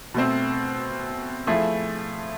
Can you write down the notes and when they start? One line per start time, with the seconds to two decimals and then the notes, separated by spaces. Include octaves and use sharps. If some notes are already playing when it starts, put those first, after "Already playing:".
0.14 B2 A3 C4
1.47 F3 A3 E4 G#4